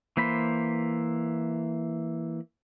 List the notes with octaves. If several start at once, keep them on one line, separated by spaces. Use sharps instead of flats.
E3 A#3 C5 B5